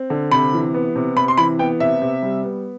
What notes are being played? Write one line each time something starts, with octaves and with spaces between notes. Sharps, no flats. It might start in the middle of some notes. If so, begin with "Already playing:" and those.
Already playing: C4
D3
C3 B5
E3
B3
C3
C3 B5
C6
E3 B5
B3 G5
C3 E5
C3
G3
B3